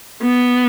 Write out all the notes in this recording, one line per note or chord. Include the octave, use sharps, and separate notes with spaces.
B3